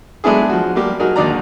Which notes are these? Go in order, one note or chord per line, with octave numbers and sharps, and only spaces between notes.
G#3 A3 B3 D4 E4 G#4
F3 F#4
F#3 G3 A#3 G4
F#3 D#4 F#4 G#4 A#4
D#2 D3 D#4 D5 A#5